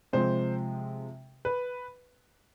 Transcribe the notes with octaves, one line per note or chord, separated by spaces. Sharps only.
C3 F3 G#3 C5
B4